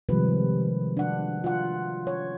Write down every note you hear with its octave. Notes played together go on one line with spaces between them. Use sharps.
C3 D#3 F3 G3 G#3 B4
D4 F#5
F4 F#5
C#5